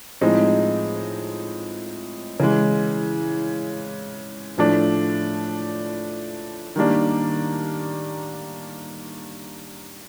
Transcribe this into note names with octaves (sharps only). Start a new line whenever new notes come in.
A2 F3 G#3 C4 D#4
C#3 E3 G#3
A2 F3 A3 D4
D#3 G3 A#3 D4